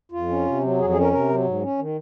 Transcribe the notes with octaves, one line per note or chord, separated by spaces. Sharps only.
F2 F4
C#4
C3
F#3
F2 G#4
G#4
C#4
A#4
C3 A#4
F#3
G#2
C#4
D#3